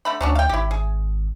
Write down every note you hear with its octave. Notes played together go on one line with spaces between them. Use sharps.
D3 A3 B5
D2 F#3 C#4 D4
F5 G5
G#1 E4 G4
G#4